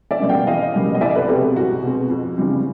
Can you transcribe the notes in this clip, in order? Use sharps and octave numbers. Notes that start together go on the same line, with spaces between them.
D5 E5
B2 G3 A#3 C#4
F5 G5
E2 D#5 F5
B2 G3 A#3 C#4
D#5
C2 D5 E5
A4 B4
B2 G#3 C4 G4 A4
C2 F#4
B2 G#3 C4
F2
C#3 E3 G3 C4